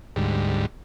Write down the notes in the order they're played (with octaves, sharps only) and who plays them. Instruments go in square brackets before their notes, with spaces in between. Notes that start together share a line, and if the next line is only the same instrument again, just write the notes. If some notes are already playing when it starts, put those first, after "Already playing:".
[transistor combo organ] D2 G#2 G3